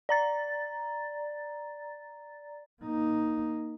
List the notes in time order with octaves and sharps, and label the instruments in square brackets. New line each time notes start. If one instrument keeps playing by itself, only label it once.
[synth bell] D5 A#5 A6
[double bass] A#3 D#4